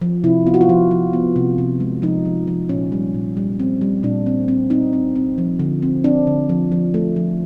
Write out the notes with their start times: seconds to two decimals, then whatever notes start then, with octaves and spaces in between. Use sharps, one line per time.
0.02 F3
0.24 C3 E4
0.46 B3 F4
0.54 F#4
0.61 F4
0.69 F3
0.91 F3
1.13 B3
1.36 C3
1.58 C3
1.80 G#3
2.02 F3 D#4
2.25 F3
2.48 F3
2.69 A#2 C#4
2.92 G3
3.14 A#2
3.37 G3
3.59 C4
3.81 G3
4.03 A#2 D4
4.26 C4
4.48 C4
4.70 C4 D#4
4.93 C4
5.15 C4
5.38 F3
5.59 D3
5.82 C4
6.04 C4 D4
6.27 D3
6.49 F3
6.72 F3
6.94 A3
7.16 F3